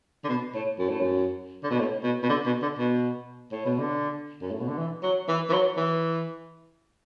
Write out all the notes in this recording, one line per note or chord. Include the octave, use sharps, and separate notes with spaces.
D3
B2
A2
F#2
A2
F#2
D3
B2
A2
B2
B2
D3
B2
D3
B2
A2
B2
D3
F#2
A2
B2
D3
E3
F#3
E3
E3
F#3
E3